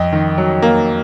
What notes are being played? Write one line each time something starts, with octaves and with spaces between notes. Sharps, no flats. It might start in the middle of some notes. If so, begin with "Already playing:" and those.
Already playing: F2 D#5
D#3
F#3
A#3